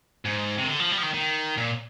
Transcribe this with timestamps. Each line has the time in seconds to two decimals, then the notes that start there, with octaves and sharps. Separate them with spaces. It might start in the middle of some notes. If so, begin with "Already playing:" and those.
0.25 G#2
0.58 C3
0.63 D#3
0.69 D3
0.80 F3
0.92 G3
0.98 F3
1.03 D#3
1.14 D#3
1.57 A#2